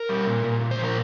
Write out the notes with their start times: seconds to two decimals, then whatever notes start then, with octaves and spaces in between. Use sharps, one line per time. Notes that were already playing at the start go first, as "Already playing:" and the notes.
Already playing: A#4
0.09 G3
0.26 A#2
0.44 A#2
0.61 A#2
0.71 C5
0.79 F3
0.84 A#4